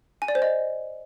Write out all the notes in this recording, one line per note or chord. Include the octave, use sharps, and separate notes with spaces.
G#5
D5
C5
D#5